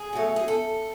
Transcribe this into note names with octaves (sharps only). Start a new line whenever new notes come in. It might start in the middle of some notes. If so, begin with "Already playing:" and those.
Already playing: G#4
B2 F#3 A3
G#4
A4